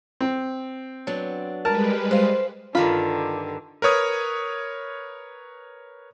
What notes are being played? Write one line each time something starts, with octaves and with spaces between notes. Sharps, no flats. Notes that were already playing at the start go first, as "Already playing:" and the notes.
C4
F#3 B3 D4
G3 G#3 A#4 B4 A5
C5 F5
G2 D3 D#3 F4 B5
A#4 B4 C#5 D#6 G#6